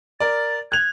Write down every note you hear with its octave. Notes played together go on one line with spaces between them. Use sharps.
A#4 D5 A6
F#6 G#6 F7